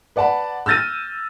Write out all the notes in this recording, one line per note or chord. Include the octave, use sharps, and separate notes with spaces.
B4 D5 F#5 A5 B5
E6 F6 G6 A6 A#6 D#7